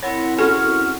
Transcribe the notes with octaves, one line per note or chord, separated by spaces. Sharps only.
C4 E4 A#4 C#5 F#5 B5
C#4 F#4 G#4 A4 F#5 C#6 F6